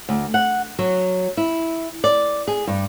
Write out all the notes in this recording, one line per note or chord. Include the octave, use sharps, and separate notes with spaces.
D2
F#5
F#3
E4
D5
G#4
G2